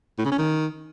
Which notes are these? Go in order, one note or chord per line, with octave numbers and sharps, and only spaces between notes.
A2
C#3
C#4
D#3